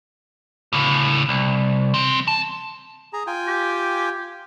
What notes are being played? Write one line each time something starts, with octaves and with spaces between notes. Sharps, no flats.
A2 C#3
C2
E3 C4
A5
G#4 A#5
F4 G5 G#5
G4